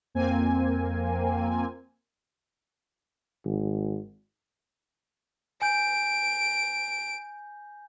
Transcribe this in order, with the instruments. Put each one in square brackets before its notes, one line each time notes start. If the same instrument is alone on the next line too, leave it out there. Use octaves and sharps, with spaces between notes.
[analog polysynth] F2 A#3 C4 G#5
[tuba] G#1
[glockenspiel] G#5 G6 [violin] D7